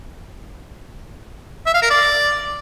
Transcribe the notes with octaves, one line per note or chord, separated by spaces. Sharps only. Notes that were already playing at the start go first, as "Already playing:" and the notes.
E5
F5
A#4
D5